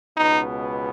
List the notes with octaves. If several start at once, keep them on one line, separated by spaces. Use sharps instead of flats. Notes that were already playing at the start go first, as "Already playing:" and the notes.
C#2 B2 B3 D#4